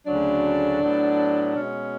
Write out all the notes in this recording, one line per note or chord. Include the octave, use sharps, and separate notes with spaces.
D2 C#3 F#3 A3 D4
A2 F#3 B3
B2 G#3 B3 C#4